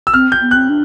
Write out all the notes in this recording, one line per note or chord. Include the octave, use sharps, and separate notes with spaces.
E6
C4 F6
G6
B3
C4 F#6
D4